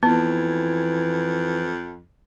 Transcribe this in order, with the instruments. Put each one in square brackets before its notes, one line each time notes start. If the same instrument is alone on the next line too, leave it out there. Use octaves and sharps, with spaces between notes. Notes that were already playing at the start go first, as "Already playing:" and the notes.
[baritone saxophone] F2 [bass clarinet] E3 [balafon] B3 [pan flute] E4